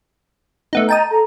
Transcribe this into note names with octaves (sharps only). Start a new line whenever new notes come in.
A3 B3 D#4
D#5 G5 A5 A#5 D#6
A4 A#5